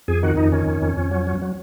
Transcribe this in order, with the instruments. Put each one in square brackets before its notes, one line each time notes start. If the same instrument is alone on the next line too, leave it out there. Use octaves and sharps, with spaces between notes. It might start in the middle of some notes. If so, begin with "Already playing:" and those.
[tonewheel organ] F2 G#4
D#3 F#4
F2 D#4
D#3 C#4
F2
F2
F2
F#3
F#3
F#3